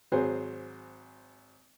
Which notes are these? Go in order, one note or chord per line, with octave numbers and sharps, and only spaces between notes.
G#1 F#3 G#4 C5